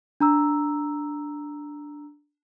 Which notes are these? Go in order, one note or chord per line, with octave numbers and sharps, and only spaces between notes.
D4 A#5 E6